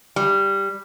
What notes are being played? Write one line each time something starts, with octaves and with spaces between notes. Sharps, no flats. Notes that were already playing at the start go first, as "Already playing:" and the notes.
G3